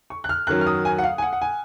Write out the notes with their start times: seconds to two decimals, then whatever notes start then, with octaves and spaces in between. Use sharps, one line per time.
0.10 C#6
0.24 F#6
0.29 F6
0.47 F#2 D#3 F#3 F#6
0.61 F6
0.67 D#6
0.85 G#5
0.98 F#5
1.04 F5
1.18 G#5
1.22 F#5
1.33 F#5
1.42 G#5